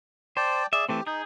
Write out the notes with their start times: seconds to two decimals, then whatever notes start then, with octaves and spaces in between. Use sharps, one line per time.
0.37 C5 D5 G5 A5
0.73 G#4 D5 E5
0.89 E3 A3 C4 G4
1.07 D#4 G#4 G6